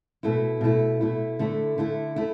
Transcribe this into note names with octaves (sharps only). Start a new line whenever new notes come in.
B2 A3 E4
B2 A3 E4
B2 A3 E4
D3 A3 E4
D3 A3 E4
A3 E4